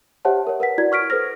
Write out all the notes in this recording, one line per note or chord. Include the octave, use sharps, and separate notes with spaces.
G4 C5 C#5 E5 F#5 A5
A#4 C#5
A#4 B4 F#5 B6
E4 F#4 D5 G#6
C#6 F6 B6 D7
A4 B4 C5 F6 A#6